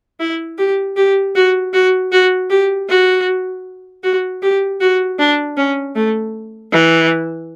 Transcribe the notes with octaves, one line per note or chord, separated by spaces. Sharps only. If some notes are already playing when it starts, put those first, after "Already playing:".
E4
G4
G4
F#4
F#4
F#4
G4
F#4
F#4
G4
F#4
D4
C#4
A3
E3